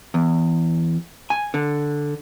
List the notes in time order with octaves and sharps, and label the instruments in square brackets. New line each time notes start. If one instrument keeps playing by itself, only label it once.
[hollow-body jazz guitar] E2
G#5
D3